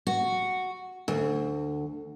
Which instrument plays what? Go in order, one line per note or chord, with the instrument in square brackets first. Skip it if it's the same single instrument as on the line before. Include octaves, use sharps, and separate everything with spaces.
[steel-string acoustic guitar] F#4
D2